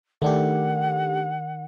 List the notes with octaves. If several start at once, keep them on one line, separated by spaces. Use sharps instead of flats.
D#3 A3 D4 G4 F#5